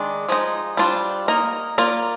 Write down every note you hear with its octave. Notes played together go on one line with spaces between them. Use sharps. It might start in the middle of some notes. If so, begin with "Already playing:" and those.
Already playing: D#3 G#3 D4
F3 G#3 D#4
G3 D4 F4 C5
A#3 D#4 A#4 D#5
A#3 F4 A#4 D5